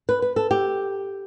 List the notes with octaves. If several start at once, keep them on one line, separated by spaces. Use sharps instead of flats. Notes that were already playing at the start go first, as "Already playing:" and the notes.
B4
B4
A4
G4